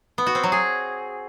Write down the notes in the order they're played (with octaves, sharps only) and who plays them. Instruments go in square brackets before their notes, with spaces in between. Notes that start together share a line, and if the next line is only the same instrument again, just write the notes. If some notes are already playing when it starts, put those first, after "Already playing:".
[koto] B3
F#4
C4
F#3
G#4